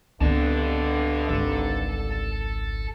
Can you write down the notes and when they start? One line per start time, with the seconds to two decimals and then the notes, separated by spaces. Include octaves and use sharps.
0.21 C#2 G2 D3 B3 C4 D#5 A5
1.29 G#1 A4